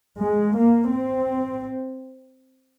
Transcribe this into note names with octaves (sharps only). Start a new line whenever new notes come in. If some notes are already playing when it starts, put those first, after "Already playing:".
G#3
A#3
C4